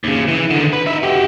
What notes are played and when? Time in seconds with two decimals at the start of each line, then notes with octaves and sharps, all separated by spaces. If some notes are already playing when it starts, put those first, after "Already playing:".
0.04 D#2 C#3
0.28 E3
0.51 D3 D#3
0.73 B4
0.86 D#4 E5
1.03 F#4 G4